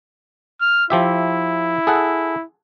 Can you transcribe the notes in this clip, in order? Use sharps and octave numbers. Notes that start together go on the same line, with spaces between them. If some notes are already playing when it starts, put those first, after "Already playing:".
F6
F3 E4 G4 E5
G#4 A4 F#5